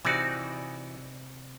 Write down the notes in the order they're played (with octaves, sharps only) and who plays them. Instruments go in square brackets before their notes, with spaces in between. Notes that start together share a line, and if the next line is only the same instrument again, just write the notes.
[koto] C3 D5 [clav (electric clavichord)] E3 D#4 F#4